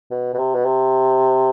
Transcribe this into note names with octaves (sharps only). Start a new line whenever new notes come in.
B2
B2
C3
B2
C3